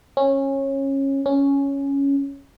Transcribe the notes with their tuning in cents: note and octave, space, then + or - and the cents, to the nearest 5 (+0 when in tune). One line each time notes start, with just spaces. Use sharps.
C#4 -20
C#4 +5